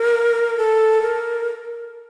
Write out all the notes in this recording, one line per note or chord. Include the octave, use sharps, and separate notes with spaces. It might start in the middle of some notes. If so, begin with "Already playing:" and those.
Already playing: A#4
A4
A#4